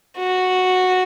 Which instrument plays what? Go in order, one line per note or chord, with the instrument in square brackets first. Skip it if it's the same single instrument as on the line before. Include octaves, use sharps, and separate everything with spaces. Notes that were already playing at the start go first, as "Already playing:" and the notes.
[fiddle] F#4